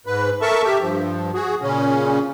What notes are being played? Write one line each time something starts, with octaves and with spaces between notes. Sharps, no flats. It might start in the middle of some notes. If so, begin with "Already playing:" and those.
G#2 B4
A4 A#4 E5 A5 C#6
G4 E5
G2 F3
F#4 G#4
A#2 C#3 C#4